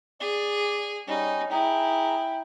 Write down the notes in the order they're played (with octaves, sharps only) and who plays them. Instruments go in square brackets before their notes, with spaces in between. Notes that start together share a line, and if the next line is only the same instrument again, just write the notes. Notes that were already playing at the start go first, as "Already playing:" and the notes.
[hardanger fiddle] G#4 [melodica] D5
[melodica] G3 C#4 [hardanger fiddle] D#4
[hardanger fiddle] E4 [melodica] G#4 A#5 [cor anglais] G5